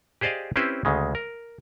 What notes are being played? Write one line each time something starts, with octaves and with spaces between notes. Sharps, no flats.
G4 G#4 C5 D5 D#5 F5
C4 C#4 E4 G4 B4 C5
D2 C#3 G#3
A#4